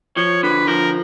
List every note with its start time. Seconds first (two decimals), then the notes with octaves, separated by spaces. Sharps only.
0.16 F3 C#5
0.43 D3 B4
0.67 F3 A#4